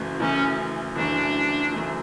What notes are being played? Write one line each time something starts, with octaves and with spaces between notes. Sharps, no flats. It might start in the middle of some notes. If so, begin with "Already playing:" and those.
Already playing: F#1 F#2 E3 A3
F#1 F#2 E3 A3 C#4
F#1 F#2 E3 A3 D4
F#1 F#2 E3 A3